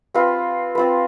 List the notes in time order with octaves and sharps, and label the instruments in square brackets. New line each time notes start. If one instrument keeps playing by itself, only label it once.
[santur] C4 F4 B4
C4 F4 B4